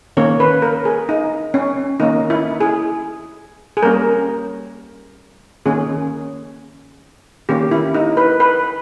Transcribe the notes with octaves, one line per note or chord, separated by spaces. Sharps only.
D#3 A#3 C#4 C#5
B4
A#4
G#4
D#4
C#4
D#3 A#3 C#4 D#4
E4
G#4
G#4
G3 A#3 C#4 A#4
D#3 A#3 C#4 G#4
D#3 A#3 C#4 G4
E4
D#4
B4
B4